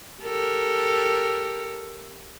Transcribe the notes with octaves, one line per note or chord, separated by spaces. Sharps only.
G4 A4 A#4